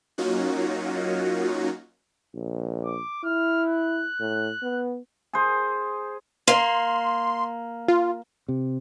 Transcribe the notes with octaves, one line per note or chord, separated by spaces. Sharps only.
F#3 A#3 C#4 D#4 F4 F#4
A#1
D6
E4 F6
F#6
A2
B3
G#4 C5
A#3 C6
F4
C3